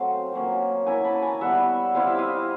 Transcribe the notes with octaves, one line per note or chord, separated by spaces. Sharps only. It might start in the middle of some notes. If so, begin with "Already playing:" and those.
Already playing: F#3 A3 C4 F5 G5
F#3 A#3 C#4
A#3 C#4 E4 G#5 A#5
A5 B5
G#5 A#5
G3 B3 E4 E5 F#5
G3 C4 E4 F5
E5
D#5 F5